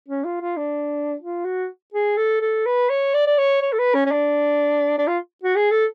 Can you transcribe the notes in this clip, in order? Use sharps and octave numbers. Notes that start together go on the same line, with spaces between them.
C#4
F4
F4
D4
F4
F#4
G#4
A4
A4
B4
C#5
D5
D5
C#5
C#5
A4
B4
C#4
C#4
D4
D4
F4
F#4
G#4
A4